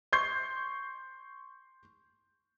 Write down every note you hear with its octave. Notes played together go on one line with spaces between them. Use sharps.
C6 C#6 G6 C7